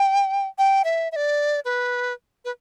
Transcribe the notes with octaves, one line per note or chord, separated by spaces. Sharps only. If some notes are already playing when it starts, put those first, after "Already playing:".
Already playing: G5
G5
E5
E5
D5
B4
B4